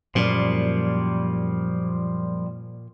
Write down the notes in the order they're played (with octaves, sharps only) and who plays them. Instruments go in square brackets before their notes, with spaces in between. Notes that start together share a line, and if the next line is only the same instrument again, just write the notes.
[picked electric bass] F#2 [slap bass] A#2 [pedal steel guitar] F3 G3 A#3